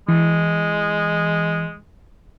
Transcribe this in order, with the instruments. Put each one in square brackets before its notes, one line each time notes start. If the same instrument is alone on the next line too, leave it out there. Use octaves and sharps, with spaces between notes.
[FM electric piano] E3 [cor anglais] G#3